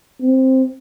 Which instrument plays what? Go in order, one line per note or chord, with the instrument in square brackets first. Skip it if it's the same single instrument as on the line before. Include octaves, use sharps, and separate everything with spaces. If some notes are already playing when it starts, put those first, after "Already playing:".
[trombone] C4